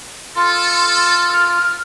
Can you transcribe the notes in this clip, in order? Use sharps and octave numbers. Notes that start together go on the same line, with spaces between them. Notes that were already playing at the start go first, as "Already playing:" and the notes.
F4 A4 C6
F6